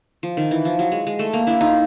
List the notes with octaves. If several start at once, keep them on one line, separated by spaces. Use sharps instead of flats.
F3
D#3
E3
F3
F#3
G#3
G#3
A3
A#3
D4 E4
D#4 F4